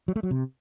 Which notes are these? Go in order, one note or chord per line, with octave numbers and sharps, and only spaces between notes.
F#3
A3
F#3
C3